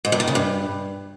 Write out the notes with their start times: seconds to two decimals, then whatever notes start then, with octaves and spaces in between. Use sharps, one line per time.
0.05 G#2
0.12 G2
0.20 D#3
0.27 C#3
0.35 G2